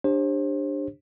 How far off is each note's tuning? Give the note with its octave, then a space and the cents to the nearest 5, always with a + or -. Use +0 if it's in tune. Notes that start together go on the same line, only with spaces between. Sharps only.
D4 +5 G4 +20 C5 +35